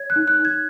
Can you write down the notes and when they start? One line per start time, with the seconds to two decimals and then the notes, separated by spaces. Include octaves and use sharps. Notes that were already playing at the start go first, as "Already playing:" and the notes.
Already playing: C#5 G#6
0.10 F#6
0.16 D#4
0.28 F#6
0.39 D#4
0.45 G#6